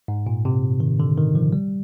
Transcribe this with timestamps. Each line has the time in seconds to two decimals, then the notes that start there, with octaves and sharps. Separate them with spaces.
0.08 G#2
0.27 A#2
0.45 C3
0.80 D#3
1.00 D3
1.18 D#3
1.35 F3
1.53 G3